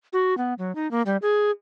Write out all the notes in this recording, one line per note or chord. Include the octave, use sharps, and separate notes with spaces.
F#4
B3
F#3
D#4
A#3
G3
G#4